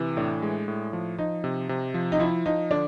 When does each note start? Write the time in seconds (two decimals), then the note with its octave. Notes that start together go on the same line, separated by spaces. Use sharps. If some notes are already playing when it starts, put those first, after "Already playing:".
Already playing: C3 E3
0.17 A2 D4
0.42 G#3
0.68 A2
0.93 F3
1.18 F3 D#4
1.44 C3
1.69 C3
1.94 F3
2.12 D#4
2.19 F3 E4
2.46 F3 D#4
2.70 D3 D4